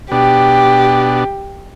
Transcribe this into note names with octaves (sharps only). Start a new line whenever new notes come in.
B2 D4 G4